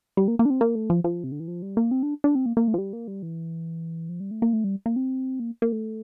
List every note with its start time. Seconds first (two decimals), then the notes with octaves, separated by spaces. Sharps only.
0.17 G3
0.28 A#3
0.39 A#3
0.45 D4
0.50 C4
0.61 A#3
0.75 A3
0.90 F3
1.04 F3
1.24 C3
1.32 D3
1.40 E3
1.48 F3
1.62 G3
1.77 A#3
1.91 C4
2.03 D4
2.24 D4
2.35 C4
2.46 A#3
2.57 A#3
2.68 A3
2.74 F3
2.78 G3
2.93 A#3
3.08 G3
3.23 E3
4.09 F3
4.20 G3
4.31 A3
4.42 A#3
4.53 A3
4.64 G3
4.86 A#3
4.96 C4
5.40 A#3
5.62 A#3
5.72 A3